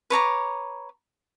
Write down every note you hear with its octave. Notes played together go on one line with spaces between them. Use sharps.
B4 C#5 A#5 D6